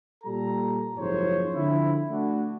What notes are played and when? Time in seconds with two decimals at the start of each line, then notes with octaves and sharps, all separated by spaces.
0.24 A#2 G3 A4 A#5
0.97 F#1 G#2 F3 C5 C#5
1.54 D3 F3 C4 E4
2.09 A3 D4 F#4